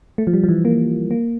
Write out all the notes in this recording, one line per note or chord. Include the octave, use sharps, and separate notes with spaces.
A3
F3
G3
F3
E3
A#3
A#3